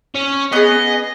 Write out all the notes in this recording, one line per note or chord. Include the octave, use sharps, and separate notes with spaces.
C#4
B3 G#4 D#5